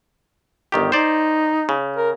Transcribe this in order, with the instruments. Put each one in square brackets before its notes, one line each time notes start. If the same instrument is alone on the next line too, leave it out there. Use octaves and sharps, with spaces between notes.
[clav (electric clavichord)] G1 D#3 G4
[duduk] D#4 [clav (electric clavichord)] C5 D5
[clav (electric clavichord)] C#3
[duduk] A#4